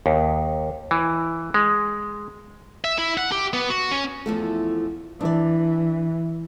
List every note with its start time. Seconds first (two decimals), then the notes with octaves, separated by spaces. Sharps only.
0.06 D#2
0.91 E3
1.54 G#3
2.84 E5
2.98 E4
3.18 F#5
3.32 G4
3.53 B3
3.70 F#4
3.91 C#4
4.26 E2 F3 A3
5.21 E3 D4 D5